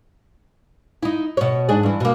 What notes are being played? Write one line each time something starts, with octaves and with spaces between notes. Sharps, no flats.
D#4 E4
B2 C#5
G#2 D4 G#4
G2 E3
B2 A#3